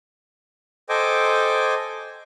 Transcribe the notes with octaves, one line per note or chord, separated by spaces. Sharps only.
A4 C5 D#5 G5 G#5 D6